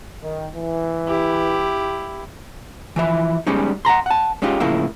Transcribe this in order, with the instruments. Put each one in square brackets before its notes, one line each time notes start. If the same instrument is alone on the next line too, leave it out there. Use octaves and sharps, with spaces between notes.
[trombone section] D#3
E3
[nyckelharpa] E4 G4
[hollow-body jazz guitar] E3 F3 E5
G3 G#3 C#4 D#4
F#5 A5 A#5 C6
F#5 A5
G#3 C#4 D#4 F4 G4
A2 C#3 F3 A#3 E4